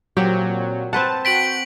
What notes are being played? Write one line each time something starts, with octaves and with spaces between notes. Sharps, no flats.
A#2 F#3 C4 G4
C4 B4 F#5 A5
F#4 G5 B6 D7 F#7